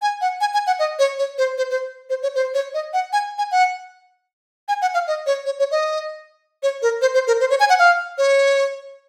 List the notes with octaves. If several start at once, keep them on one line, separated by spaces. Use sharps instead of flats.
G#5
F#5
G#5
G#5
F#5
D#5
C#5
C#5
C5
C5
C5
C5
C#5
C5
C#5
D#5
F#5
G#5
G#5
F#5
G#5
F#5
F5
D#5
C#5
C#5
C#5
D#5
C#5
A#4
C5
C5
A#4
C5
C#5
G#5
F#5
F5
C#5